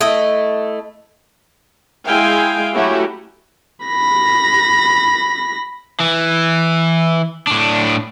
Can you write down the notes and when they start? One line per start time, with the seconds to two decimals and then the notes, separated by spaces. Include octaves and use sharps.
0.01 A3 E4 D#5
2.07 G#3 E4 F5 G5 G#5
2.73 F#3 A3 C#4 E4 F#4 G4
3.86 B5 A#6
6.00 E3
7.47 A2 D4